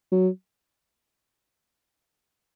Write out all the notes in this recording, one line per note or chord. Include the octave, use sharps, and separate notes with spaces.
F#3